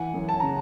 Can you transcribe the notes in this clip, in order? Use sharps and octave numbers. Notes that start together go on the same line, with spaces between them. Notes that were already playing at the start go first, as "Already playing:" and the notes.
Already playing: E3 F#5 G#5
F#2
A5
C#3 A#5